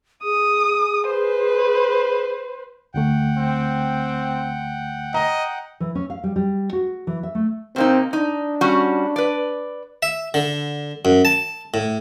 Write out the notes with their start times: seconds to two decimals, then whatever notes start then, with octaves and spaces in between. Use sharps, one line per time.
0.24 G#4 D#6
1.08 B4 C5
2.94 D2 D3 A3 F#5 G5
3.37 C4
5.14 D#5 A#5
5.80 E3
5.95 C#4
6.10 F5
6.24 G3
6.36 G3
6.73 F#4
7.07 E3
7.23 E5
7.35 A3
7.76 C3 A#3 C4 D#4
8.13 D4 D#4
8.61 G3 C#4 F#4
9.16 B4 D5
10.03 E5
10.34 D3
11.05 F#2
11.25 A5
11.74 A2